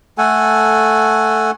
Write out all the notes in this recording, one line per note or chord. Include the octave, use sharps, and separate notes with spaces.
A3 A4 F#5 G#5